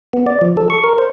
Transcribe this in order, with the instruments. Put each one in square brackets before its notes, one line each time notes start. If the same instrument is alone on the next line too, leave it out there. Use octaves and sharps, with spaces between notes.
[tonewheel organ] B3
D5
F3
A4
C#6
A#4
C5